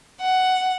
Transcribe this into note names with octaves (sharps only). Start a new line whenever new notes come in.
F#5